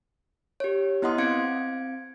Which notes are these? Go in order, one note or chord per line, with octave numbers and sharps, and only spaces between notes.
G4 C#5
B3 E4 D#5 F#5 C6 D#6
C4 F5 G#6 C#7 D7